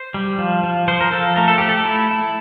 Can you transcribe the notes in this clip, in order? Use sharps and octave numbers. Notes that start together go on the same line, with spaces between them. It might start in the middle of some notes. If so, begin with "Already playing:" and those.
Already playing: C5
G3
F3
F3
F3 C5
A#4
F3 A4
A3 A#4
A4
A3 G4
A4
E4
E4